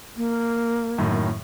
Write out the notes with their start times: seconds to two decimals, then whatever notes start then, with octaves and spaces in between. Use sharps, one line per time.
0.17 A#3
0.98 F#2 A2 D#3